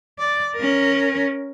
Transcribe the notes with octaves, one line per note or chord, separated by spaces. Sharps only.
D5
C#4 A#4